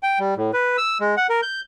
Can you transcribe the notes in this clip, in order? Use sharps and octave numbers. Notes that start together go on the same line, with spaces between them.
G5
G3
A2
B4
E6
G#3
F#5
A#4
G6